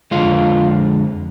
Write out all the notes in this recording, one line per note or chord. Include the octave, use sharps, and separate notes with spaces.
F2 D3 G#3 F4